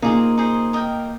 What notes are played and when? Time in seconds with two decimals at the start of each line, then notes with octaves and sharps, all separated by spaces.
0.02 A#2 A#3 D#4 G#4 C5
0.37 D#4 G#4 C5
0.73 A#4 D#5 G5